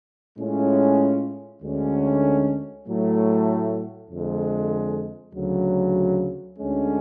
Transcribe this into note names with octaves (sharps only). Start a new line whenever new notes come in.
A2 G#3 C#4 F4
D2 D3 G#3 C#4
A2 F#3 A3
F2 D3 G#3
D2 C#3 F#3
D2 D3 G#3 C#4